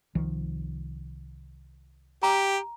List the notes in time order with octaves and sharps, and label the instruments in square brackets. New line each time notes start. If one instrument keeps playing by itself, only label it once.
[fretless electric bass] C2 D#3 F3
[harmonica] G4 [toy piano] A#5